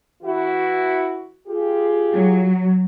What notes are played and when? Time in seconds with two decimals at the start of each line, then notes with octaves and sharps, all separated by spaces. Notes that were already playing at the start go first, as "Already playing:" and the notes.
0.23 E3 E4 F#4
1.48 F4 G4 G#4
2.13 F#3